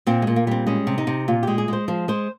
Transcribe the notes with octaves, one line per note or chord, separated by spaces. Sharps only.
A#2 C4
A#2 G#3
A#3
G3 C4
G#3 C#4
C3
D#4
C3
A#2 F4
G#3 G4
G#4
G#3 C5
F3 C5
G#3 C5